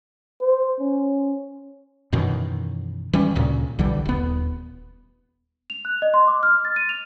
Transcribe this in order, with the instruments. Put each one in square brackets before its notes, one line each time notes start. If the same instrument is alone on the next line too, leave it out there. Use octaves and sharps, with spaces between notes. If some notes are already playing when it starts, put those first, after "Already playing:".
[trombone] C5
C#4
[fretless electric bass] F#2 B2 D#3 E3
E3 G3 C#4
D2 A#2 C#3
B1 D3 E3 G3
D#1 B3
[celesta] F7
F#6
D#5
C6
D6
F6
A6
D#7
F7